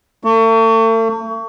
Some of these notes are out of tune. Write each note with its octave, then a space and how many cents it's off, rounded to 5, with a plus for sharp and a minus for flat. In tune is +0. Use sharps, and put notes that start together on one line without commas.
A3 +40